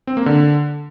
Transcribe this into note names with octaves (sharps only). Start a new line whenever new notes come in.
C4
A#3
D3